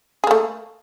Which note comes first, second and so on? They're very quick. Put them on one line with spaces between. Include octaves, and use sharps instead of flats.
G#4 A#3 A3